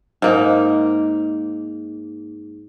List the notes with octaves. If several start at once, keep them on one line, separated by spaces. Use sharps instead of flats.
G#2 A#3 D#4